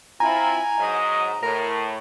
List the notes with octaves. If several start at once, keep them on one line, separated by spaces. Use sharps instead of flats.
C4 E4 F4 G#5 A#5
G#2 F#3 D#5
A2 A#4